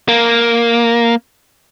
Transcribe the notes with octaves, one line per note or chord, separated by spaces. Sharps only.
A#3